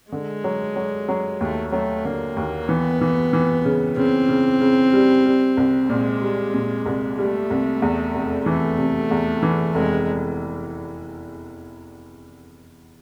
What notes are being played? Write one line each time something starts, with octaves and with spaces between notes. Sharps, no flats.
D3 G#3
F#3
F#3
F#3
D#2 A3
F#3 A3
D3 A#3
D#2
E3 B3
E3
E3
C#3
C#3 C4
C#3
C#3
G3
G3
C2
A#2 G#3
G3
A#2
C2
G3 A3
C2
E2
F1
E3 A3
C3
E2
E3
F1 G#3